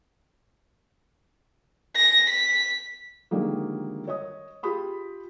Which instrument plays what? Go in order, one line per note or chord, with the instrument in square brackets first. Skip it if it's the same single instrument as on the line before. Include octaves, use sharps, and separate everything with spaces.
[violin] A#6
B6
[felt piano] D3 D#3 F3 G3 G#3 A#3
C#5 D#5 D#6
F4 G4 G#4 B5 D#6